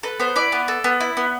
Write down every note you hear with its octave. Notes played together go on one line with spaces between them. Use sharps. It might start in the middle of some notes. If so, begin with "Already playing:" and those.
A4 B4
B3 C5
E4 D5
B3
A4
B3
E4
B3